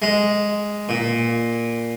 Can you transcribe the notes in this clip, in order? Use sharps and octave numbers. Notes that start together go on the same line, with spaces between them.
G#3
A#2